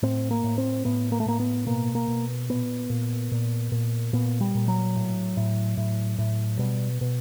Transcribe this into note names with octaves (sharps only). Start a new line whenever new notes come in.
A2 C4
A#3
A2
C4
A2 B3
A#3
A3
A2 A#3
B3
B2 A#3
A#3
B2
A#2 B3
A#2
A#2
A#2
A#2 B3
G3
A#2
F#3
A2
A2
A2
A2
B2 G3
B2